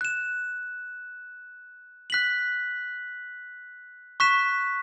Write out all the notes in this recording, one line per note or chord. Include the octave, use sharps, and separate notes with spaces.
F#6 E7
F#6 B6 F#7
C#6 F#6 B6 E7